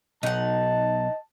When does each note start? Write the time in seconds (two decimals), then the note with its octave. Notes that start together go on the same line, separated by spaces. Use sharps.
0.23 B1 D#4 D#5 F#5 A5